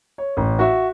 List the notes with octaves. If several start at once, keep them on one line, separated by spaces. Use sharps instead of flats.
C#5
A1
F#4 E5